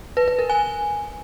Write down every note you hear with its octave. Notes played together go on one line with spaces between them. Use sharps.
B4
B4
A#4
G#5